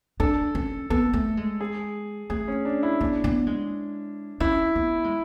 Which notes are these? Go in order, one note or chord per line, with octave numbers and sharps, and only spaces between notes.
D4 A4
C#4
B3 A4
A3
G#3
G#4
A3 G#4
C#4
D4
E4
B3 D4
B3
G#3
C#4 E4
B3
G#3